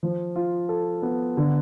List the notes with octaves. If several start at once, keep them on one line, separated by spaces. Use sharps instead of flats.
F3
F4
A4
B3
D3